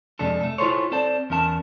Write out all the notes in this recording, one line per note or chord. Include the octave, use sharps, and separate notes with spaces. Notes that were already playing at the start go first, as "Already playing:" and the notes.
F2 C3 G#3 D4 A4
A3 A4
E4 F4 G#4 A4 C5 C#5
C4 A4 C5 D5 A5
E2 C#4 A#4 A5